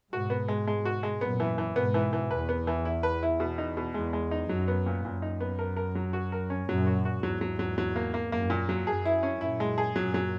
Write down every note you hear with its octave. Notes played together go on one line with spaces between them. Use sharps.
G#2 B2 F#4
B3
G#3
G#3
F#4
G#3
F#2 A#2 B3
E3
E3
G#2 B2 B3
E3
E3
E2 B4
B3
E3
E4
B4
E4
B2
D#4
B2
E2 G#3
G#3
D#4
F#2 F#3
B3
A#2
F#2 A#2
D#4
B3
A#4
A#4
F#3
F#4
A#4
C#4
F#2 A#2 F#3
F#4
F#4
E2 G#2 F#3
F#3
F#3
F#3
A#3
A#3
F#2 A#3
A#2
F#3
F#2 G#4
E4
C#4
F#2 A#2 E4
G#3
G#4
F#2 A#2 F#3
F#3